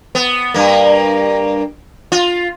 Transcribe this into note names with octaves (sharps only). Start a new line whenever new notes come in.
B3
G2 A#3
F4